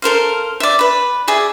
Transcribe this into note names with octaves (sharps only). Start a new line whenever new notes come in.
A4 A#4 C5 F5
D5 E5
B4 B5
G#4 D5 E5